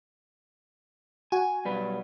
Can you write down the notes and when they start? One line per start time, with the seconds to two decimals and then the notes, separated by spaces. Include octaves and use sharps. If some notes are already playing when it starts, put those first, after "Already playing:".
1.32 F#4 G#5
1.65 B1 G3 B4